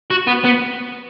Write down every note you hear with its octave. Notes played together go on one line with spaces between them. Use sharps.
F#4
B3
B3